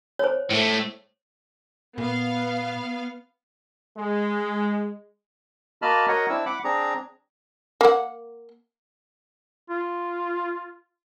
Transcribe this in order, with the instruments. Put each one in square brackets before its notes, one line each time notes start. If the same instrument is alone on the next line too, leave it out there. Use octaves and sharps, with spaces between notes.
[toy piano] C5 C#5
[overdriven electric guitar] A2 A3
[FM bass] A#2 [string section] B3 F5
[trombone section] G#3
[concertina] A#3 F#4 D#5 A5 B5 F6
F#4 A#4 C#5 D#5 F#5
C4 D4 E4 E6
F#5 B5 D6
C4 D4 G#4 A#5
[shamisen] A#3 F#5
[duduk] F4